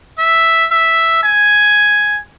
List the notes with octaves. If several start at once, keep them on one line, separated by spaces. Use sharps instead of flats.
E5
E5
G#5